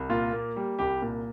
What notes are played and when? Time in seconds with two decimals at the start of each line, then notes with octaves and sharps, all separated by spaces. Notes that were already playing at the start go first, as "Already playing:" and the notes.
Already playing: C2
0.09 A#2 F4
0.32 A#3
0.56 G3
0.79 C2 G4
1.02 A#2